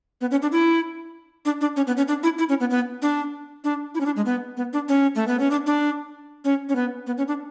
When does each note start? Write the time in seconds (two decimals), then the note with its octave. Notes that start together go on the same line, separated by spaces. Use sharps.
0.21 B3
0.31 C#4
0.42 D4
0.52 E4
1.45 D4
1.61 D4
1.76 C#4
1.87 B3
1.97 C#4
2.08 D4
2.23 E4
2.39 E4
2.49 C#4
2.60 B3
2.70 B3
3.02 D4
3.64 D4
3.95 E4
4.00 C#4
4.06 D4
4.16 G#3
4.26 B3
4.57 B3
4.73 D4
4.88 C#4
5.15 A3
5.27 B3
5.39 C#4
5.51 D4
5.66 D4
6.45 C#4
6.69 C#4
6.76 B3
7.07 B3
7.18 C#4
7.28 D4